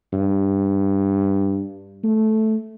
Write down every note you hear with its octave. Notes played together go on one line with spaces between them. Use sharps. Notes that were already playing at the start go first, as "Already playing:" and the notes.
G2
A3